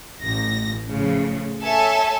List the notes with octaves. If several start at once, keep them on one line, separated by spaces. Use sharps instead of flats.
A1 A#6
A2 C#3 F3
A4 C#5 E5 G#5 A5